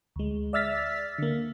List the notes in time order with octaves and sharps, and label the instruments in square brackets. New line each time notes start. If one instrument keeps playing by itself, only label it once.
[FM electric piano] D2 G#3
D5 E5 E6 F6 A6 B6
D3 A#3